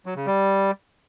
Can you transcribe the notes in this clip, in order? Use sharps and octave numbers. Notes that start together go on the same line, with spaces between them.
F#3
C#3
G3